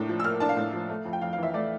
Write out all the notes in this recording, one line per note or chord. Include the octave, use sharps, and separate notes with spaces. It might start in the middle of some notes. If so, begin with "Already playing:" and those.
Already playing: A2 A#3 D4
F3
E6
A#3 F6
D4 A5
F5
A2
F3
A3
F2
G5
F2 F5
F5
E3 E5
A3 D5